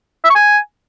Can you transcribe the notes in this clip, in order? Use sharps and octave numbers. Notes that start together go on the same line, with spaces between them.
E5
C#6
G#5